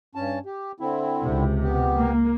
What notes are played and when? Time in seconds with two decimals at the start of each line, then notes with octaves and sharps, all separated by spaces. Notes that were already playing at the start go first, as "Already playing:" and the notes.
0.15 G2 C#4 A5
0.45 G4
0.80 D3 C4 E4
1.23 C#2 C3
1.63 B3 G4
1.98 A#3